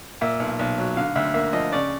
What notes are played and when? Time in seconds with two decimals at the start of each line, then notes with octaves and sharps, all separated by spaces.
0.21 A#2 E5
0.40 B1
0.59 B1
0.78 F#3
0.97 D3 F5
1.16 D2 E5
1.34 A#3 E5
1.53 F3 D#5
1.72 C#3 D5